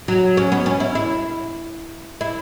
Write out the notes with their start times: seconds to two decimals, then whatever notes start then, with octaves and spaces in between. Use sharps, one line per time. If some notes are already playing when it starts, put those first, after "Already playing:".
0.08 F#3
0.37 C#4
0.52 B3
0.66 C#4
0.80 E4
0.95 E4
2.21 E4